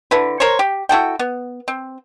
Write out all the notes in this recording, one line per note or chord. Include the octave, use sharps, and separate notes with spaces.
D3 E4 B4
A#4 C5 C#5
G4
E4 F#4 A4 G5
B3
C4